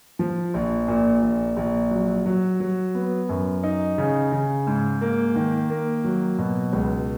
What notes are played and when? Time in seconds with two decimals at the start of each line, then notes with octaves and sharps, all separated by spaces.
0.19 F3
0.54 A#1
0.88 A#2
1.22 A#1
1.57 A#1
1.91 F#3
2.26 F#3
2.60 F#3
2.95 B3
3.29 F#2
3.63 D#4
3.98 C#3
4.32 C#3
4.67 G#2
5.01 A#3
5.36 D#3
5.70 A#3
6.04 F#3
6.39 B2
6.73 C#2